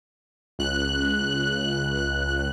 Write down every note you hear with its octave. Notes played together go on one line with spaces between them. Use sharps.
C#2 F#6